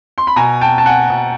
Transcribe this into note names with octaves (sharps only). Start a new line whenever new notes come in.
C6
B5
B2 G#5 A#5
G5 A5
A5
F#5 G#5
B2